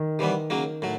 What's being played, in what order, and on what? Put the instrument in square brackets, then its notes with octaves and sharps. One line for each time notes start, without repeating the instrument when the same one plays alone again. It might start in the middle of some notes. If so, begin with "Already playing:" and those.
Already playing: [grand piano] D#3
[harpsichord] C3 E3 G3 B3
C#3 F#3 A#3
A2 F#3